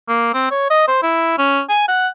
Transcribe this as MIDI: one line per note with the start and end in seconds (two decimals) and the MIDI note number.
0.08 0.34 58
0.34 0.50 60
0.51 0.66 73
0.70 0.85 75
0.88 0.99 72
1.03 1.38 64
1.39 1.62 61
1.69 1.87 80
1.88 2.08 78